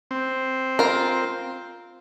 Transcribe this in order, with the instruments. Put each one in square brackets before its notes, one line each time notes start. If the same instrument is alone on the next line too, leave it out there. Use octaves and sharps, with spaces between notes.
[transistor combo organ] C4
[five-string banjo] F4 A#4